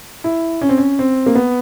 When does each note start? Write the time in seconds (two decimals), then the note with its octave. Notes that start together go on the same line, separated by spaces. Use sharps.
0.24 E4
0.62 C#4
0.69 C4
0.78 C#4
0.99 C4
1.26 A#3
1.35 B3